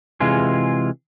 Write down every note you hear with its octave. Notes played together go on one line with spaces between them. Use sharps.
C3 E3 G#3 F4 G#4